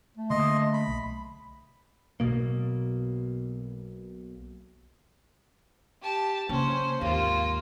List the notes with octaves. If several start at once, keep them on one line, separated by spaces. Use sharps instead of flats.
A3
D3 A#3 D#5 C6
B5
B1
B1 B2 A#3
G4 A5
C#3 A#3 C#4 C5
G#1 D#2 A#3 F4